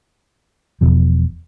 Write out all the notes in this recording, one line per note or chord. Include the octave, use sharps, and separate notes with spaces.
E1 C#2 B2 F3